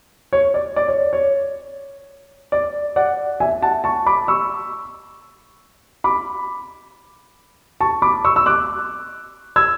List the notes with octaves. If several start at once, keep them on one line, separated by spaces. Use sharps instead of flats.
C#5
D5
D5
C#5
C#5
D5
D5 F#5
E5 G#5
F#5 A5
A5 C#6
B5 D6
C#6 E6
B5 D6
A5 C#6
B5 D6
C#6 E6
E6
D6 F#6
E6 G#6